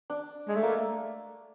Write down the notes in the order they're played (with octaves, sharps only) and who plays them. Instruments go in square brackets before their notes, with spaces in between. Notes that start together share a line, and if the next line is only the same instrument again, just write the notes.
[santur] D4
[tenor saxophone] G#3
A3
[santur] A#3